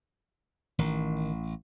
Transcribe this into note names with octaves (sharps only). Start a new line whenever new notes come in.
A1 D#3